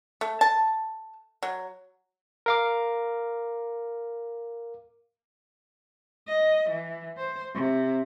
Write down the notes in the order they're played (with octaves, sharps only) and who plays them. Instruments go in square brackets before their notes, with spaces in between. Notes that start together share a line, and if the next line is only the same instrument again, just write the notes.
[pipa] A3
A5
F#3
[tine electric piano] A#4 F5 D6
[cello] D#5
E3
C5
C3